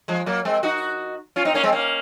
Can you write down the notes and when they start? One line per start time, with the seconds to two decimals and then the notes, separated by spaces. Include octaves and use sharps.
0.08 F3 G#3
0.26 F#3 A#3
0.45 G#3 C4
0.63 D#4 F#4
1.36 C#4 F4
1.45 C4 D#4
1.54 A#3 C#4
1.63 G#3 C4
1.72 A#3 C#4